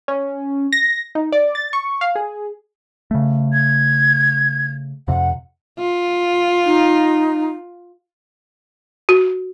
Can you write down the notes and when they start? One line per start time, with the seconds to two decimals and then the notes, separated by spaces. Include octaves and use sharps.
0.08 C#4
0.73 A#6
1.15 D#4
1.32 D5
1.55 A6
1.73 C#6
2.01 F5
2.15 G#4
3.11 C#3 A3
3.52 G#6
5.08 F2 C3 F#5
5.79 F4
6.65 D#4
9.09 F#4